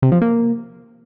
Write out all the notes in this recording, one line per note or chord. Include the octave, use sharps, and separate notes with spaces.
C3
F3
A#3